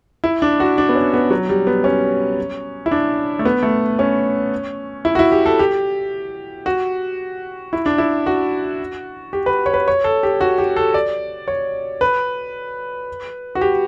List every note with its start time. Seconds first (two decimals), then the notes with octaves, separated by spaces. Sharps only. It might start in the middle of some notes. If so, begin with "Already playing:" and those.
0.24 E4
0.42 D4
0.60 F#4
0.78 D4
0.89 B3
0.95 C#4
1.14 B3
1.30 F#3
1.49 G3
1.67 B3
1.84 C#4
2.86 E4
2.91 D4
3.39 A3
3.45 B3
3.63 A3
3.99 C#4
5.05 E4
5.15 F#4
5.19 E4
5.32 G4
5.46 A4
5.59 G4
6.66 F#4
7.73 E4
7.86 D4
7.98 E4
8.26 F#4
9.33 G4
9.46 B4
9.66 C#5
9.74 B4
9.88 C#5
10.04 A4
10.23 G4
10.41 F#4
10.58 G4
10.76 A4
10.94 D5
11.48 C#5
12.01 B4
13.55 F#4
13.61 G4